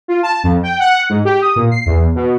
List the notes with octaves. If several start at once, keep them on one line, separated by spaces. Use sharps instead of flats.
F4
A5
F2
G5
F#5
G#2
G4
D#6
A#2
C7
E2
B2